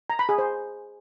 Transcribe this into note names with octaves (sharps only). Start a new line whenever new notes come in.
A#5
B5
G#4
C5